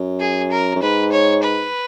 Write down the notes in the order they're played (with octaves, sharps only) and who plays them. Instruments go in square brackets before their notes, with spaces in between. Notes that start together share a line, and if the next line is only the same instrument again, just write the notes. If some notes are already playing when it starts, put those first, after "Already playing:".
Already playing: [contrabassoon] F#2
[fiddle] G#4
A#4
[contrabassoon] F#2
[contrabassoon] G#2 [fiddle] B4
[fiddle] C#5
B4